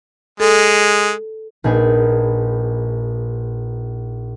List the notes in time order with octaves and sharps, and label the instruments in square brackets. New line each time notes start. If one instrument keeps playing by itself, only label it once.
[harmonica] G#3 [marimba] A4
[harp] A#1 D#4 G#4 B4